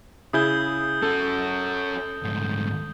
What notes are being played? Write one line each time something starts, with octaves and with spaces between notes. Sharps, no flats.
C#3 E4 G#4 D#6 G6 G7
C#4 F#4 A4
D2 G#2